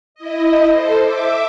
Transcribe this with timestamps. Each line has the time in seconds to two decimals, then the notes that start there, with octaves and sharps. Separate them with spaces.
0.15 E4 D#5
0.70 A4 C5
1.01 E5 D6